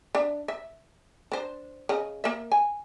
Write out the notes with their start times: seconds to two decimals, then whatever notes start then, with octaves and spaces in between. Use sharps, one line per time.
0.15 D4 E5
0.48 E5
1.32 D4 C5
1.89 C#3 D#5
2.24 A#3 E5
2.52 G#5